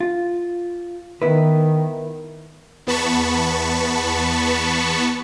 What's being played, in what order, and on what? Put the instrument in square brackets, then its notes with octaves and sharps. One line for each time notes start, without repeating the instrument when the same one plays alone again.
[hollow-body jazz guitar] F4
[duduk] D#3 [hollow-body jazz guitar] B3 E4 B4
[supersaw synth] E2 B3 A5 B5 C#6